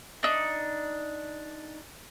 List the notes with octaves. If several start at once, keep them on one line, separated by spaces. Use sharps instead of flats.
D4 D#4